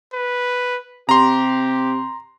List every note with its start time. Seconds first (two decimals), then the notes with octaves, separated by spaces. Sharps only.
0.13 B4
1.09 C3 G4 A#5 C6